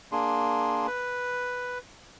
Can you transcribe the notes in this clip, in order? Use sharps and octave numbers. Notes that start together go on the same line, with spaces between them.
A#3 D4 G#4 C6
B4